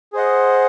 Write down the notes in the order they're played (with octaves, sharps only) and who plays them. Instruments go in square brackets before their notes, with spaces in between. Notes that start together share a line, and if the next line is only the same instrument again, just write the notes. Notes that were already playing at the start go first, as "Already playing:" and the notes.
[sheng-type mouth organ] G#4 C5 D#5 F#5